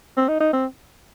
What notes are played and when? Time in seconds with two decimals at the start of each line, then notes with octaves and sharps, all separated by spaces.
0.17 C4
0.29 D#4
0.41 D#4
0.53 C4